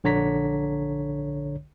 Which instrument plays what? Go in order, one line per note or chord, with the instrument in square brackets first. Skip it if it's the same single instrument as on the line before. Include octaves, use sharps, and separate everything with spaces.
[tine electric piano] A#1 D3 C#5 A#5 B6